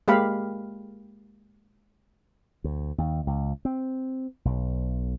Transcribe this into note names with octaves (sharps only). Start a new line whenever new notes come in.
G#3 A#3 G4 F5 B5
D2
D#2
C#2
C4
B1